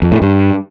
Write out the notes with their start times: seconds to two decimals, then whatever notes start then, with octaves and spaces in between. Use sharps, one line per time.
0.02 F2
0.12 A2
0.22 G2